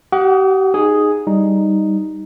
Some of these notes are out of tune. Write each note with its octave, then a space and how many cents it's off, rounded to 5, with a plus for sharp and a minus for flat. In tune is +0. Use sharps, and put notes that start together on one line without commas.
G4 -40 F#5 -10 D#6 +0
D#4 -15 G#4 +0
G3 +0 D#4 +0